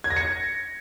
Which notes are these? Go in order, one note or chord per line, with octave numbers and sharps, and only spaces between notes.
G#6
A#6
C#7